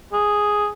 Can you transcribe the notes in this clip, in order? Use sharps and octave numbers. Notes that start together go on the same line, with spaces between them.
G#4